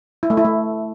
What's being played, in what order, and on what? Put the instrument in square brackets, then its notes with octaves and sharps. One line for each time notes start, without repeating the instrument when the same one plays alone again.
[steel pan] E4
A3
E4
A3